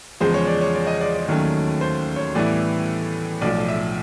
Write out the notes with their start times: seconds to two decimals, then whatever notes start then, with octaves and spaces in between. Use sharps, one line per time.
0.21 E2 C#3 F3 G#3 C5
0.34 C#5
0.47 D5
0.61 C#5
0.75 D5
0.87 D#5
1.01 D5
1.14 D5
1.28 D#2 D#3 F#3 A3 C#4
1.81 C5
2.16 C#5
2.35 A2 E3 G3 B3 E4 D5
3.41 B1 A2 F3 D5
3.68 E5